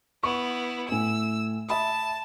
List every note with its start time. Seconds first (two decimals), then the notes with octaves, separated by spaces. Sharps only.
0.23 B3 E4 C#6
0.89 A2 G#5 E6
1.69 E5 A5 B5 D#6